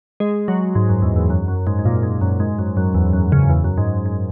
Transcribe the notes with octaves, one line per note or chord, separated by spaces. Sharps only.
G#3
F#3
G#2
F#2
E2
E2
F#2
F#2
G#2
G#2
A#2
G#2
F#2
G#2
F#2
F#2
E2
F#2
C#3
E2
F#2
G#2
G#2